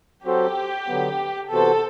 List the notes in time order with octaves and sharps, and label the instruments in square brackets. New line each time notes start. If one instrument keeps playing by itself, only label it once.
[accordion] F#3 C4 F#4 A4 C5 [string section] G4
[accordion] D3 F#3 B3
[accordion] C3 E3 B3 F#4 C5 [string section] A4